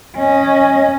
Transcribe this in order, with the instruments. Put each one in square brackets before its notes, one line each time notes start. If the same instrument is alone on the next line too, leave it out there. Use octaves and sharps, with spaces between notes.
[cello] C#4 D#5